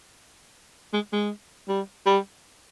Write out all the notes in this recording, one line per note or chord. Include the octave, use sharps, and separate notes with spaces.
G#3
G#3
G3
G3